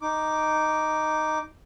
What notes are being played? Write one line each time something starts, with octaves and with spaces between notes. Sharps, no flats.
D#4 D6